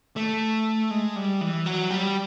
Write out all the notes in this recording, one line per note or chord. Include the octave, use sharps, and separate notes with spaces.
A3
G#3
G3
E3
F#3
G3